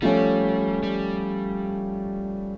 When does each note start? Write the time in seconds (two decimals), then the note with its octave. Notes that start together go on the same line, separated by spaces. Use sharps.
0.02 F3 G3 A3 C#4
0.83 G3